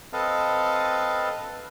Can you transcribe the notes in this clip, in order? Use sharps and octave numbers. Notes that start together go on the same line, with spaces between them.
C4 A4 B4 D#5 F5 A5